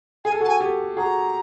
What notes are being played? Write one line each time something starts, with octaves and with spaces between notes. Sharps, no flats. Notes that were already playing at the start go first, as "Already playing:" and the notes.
G#4 G#5
A4
F#4 G#4 A5
G#5
G4 A4
F#4 G#4 A#5